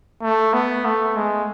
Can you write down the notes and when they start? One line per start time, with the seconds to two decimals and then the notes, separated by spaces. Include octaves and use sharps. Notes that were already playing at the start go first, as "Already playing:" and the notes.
0.22 A3
0.54 B3
0.85 A3
1.17 G#3